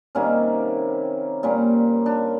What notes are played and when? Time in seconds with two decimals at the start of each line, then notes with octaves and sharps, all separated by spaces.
0.15 C3 D#3 G3 A#3 C#4
1.43 A#2 G3 A#3 C#4
2.06 D4